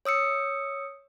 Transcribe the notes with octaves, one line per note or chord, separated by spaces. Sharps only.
C#5 D#6 E6 C#7